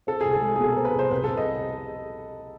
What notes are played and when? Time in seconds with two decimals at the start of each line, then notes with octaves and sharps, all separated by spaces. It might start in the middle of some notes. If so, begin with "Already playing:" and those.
0.07 C4 A4
0.21 C2 G#4
0.33 A4
0.41 G#3
0.56 B2 G#4
0.64 A4
0.72 C4 A#4
0.85 B4
0.95 C2 C5
1.11 C2 B4
1.24 C2 A4
1.37 D#5